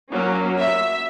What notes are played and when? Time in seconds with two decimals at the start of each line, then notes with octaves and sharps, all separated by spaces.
0.12 F#3 A#3 C#4
0.60 E5